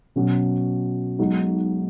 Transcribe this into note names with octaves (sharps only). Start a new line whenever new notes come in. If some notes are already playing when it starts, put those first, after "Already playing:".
B2 F#3 C#4 F#4
B1 B2 G#3 D#4 F#4